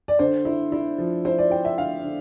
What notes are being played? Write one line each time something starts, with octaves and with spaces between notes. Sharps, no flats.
D5
D3 C5
E4
E4
F3
E4 C5
D5
E4 G5
E5
D3 F5
D3